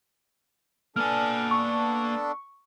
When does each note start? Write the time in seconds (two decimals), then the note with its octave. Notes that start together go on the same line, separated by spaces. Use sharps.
0.96 A#3 B3 D4 A4 G#5 F6
1.51 C#6